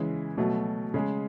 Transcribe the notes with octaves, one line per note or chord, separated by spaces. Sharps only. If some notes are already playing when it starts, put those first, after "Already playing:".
Already playing: C#3 E3 G#3
B2 F#3 A3
C#3 G#3